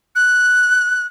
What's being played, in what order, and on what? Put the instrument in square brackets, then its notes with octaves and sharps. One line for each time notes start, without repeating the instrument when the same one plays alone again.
[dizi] F#6